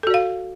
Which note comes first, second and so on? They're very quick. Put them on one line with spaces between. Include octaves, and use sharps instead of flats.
A4 F#4 D5 F5